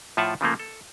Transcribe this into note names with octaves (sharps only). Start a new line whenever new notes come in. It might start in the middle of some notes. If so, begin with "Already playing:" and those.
A2 F3 F4 E5 F#5 A5
C#3 F3 A3 A#3
A4